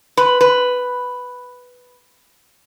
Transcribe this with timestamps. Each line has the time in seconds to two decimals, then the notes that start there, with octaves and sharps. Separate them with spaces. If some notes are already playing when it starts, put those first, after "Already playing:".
0.17 B4
0.41 B4